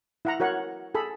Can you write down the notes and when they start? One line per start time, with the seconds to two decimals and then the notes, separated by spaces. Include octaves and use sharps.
0.25 E4 F#5 A#5
0.40 F#4 A#4 C#5 F#5
0.95 G#4 A4 B5